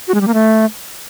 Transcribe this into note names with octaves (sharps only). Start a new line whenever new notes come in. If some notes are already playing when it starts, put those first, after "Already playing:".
F#4
G#3
G3
A#3
A3